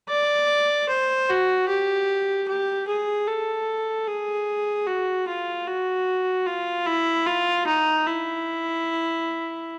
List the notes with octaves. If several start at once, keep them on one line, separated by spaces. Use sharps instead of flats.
D5
C5
F#4
G4
G4
G#4
A4
G#4
F#4
F4
F#4
F4
E4
F4
D#4
E4